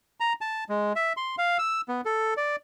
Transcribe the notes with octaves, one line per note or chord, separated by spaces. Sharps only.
A#5
A5
G#3
E5
C6
F5
E6
B3
A4
D5